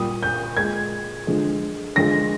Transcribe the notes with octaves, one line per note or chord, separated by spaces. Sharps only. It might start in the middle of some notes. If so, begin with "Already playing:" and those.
Already playing: A#2 G3 D#6
G6
A#2 G#3 G#6
D3 F3 G#3
D3 F3 G#3 A#6